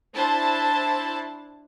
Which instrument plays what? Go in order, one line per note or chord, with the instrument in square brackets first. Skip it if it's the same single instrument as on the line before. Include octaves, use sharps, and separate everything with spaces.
[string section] D4 E4 C5 A5